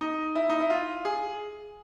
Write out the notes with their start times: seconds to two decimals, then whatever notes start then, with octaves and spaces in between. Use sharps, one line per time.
0.01 D#4
0.35 E4
0.49 D#4
0.60 E4
0.70 F4
1.05 G#4